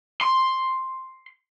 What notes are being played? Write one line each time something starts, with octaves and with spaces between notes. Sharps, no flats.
C6